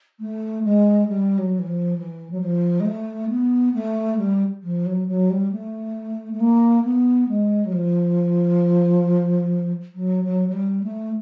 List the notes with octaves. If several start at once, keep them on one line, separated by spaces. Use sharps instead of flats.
A3
G#3
G3
F#3
E3
F3
E3
F#3
F3
G#3
A3
B3
A3
G3
F3
F#3
F#3
G3
A3
A3
A#3
B3
G#3
F#3
F3
F#3
F#3
F#3
G3
A3